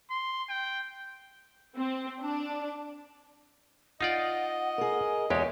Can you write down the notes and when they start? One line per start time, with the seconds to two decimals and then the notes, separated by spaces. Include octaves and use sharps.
0.11 C6
0.49 G5
1.77 C4
2.21 D4
4.01 D#4 F4 D5 D#5 F#5
4.78 G#4 A#4
5.30 E2 G#3 G4 C#5 G#5